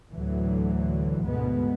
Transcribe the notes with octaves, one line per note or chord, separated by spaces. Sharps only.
D2 A2 D3 E3 F#3
D2 G#2 B2 G#3 B3